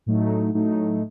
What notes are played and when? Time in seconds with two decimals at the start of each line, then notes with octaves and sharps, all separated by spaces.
0.06 A2 F#3 A3 D#4
0.54 A2 F#3 A3 D#4